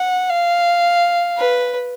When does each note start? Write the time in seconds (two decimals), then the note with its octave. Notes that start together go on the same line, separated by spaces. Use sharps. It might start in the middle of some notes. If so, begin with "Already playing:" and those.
Already playing: F#5
0.30 F5
1.37 B4